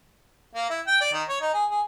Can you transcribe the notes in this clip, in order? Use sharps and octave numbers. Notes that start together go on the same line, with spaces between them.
A#3
E4
G5
D5
D#3
C#5
D#4
G#4
G#4